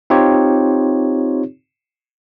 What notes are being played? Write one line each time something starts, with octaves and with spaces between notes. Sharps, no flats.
C4 D#4 F4 G4 C#5